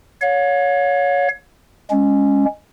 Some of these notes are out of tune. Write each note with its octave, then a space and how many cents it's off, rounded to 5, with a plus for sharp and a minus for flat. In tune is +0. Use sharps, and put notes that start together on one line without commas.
C#5 +15 F5 +45
G#3 -15 C#4 +0